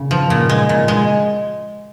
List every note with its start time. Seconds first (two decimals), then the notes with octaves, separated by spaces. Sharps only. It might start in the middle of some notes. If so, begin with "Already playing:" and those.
Already playing: A#2 C#3
0.11 F3
0.30 A#2
0.49 G#3
0.69 A#2
0.88 G#3